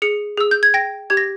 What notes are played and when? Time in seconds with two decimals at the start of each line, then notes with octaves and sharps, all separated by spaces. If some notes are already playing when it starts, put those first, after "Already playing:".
0.02 G#4 C#7
0.37 G#4 E6
0.51 G6
0.63 G#6
0.74 G5 A#6
1.10 G4 G#6
1.17 A#6